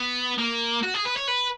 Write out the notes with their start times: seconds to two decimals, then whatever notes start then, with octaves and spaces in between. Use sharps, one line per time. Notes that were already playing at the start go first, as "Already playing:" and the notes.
Already playing: B3
0.38 A#3
0.83 F#4
0.94 G#4
1.05 B4
1.16 C#5
1.28 B4